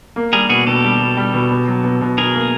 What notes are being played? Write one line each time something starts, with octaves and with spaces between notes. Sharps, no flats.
A#3
G3 G#4 A#4
B2 F#4 G#4
B2 G4 A4
G3
B2
G3
B2
B2
F#3
B2
B2
B2 G#4 A#4
A#3